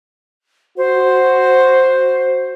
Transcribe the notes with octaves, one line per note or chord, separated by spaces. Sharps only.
F#4 C5